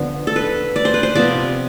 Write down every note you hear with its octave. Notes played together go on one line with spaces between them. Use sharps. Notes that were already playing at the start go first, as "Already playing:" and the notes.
Already playing: D3 F3 B3
A4
B4
D5
C5
B4
C5
C3 F3 B3 D5